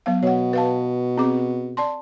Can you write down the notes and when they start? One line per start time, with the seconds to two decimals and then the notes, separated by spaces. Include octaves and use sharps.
0.06 F#3 B3 F5
0.23 B2 C#5 F#5
0.53 B4 F5 A5
1.18 C4 G#4 D6
1.77 D5 A5 C6